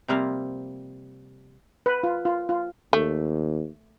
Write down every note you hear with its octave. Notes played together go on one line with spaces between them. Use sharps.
C3 F3 G3 A#3 C4 F5
B4
F4
F4
F4
D#2 A3